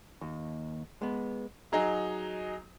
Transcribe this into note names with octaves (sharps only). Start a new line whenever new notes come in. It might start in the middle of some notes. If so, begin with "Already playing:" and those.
D#2
G#3 B3
F#3 D#4 G#4 A#5